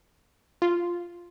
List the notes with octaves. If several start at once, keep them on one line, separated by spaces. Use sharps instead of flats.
F4